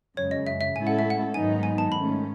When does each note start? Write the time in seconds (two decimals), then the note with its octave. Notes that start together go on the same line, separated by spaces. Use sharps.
0.17 F#2 C#3 G#3 C#5
0.31 D#5
0.47 E5
0.61 E5
0.75 A2 G#3 C#4 E4 A4 G#5
0.87 F#5
0.99 E5
1.10 F#5
1.34 G#2 D#3 F#3 B3 D#4 G#5
1.63 G#5
1.78 A5
1.92 G#2 D#3 A3 C#4 B5